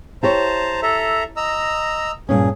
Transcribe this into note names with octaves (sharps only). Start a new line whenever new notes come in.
E4 G4 C5 C#5 A5 A#5
A4 E5 A#5
D#5 A#5 E6
G2 A#2 C#4 G#4